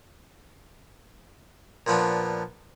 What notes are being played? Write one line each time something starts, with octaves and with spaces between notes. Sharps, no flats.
A#2 F3 B3 D4